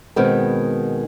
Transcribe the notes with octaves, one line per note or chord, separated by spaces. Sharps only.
B2 D#3 G#3 B3 C4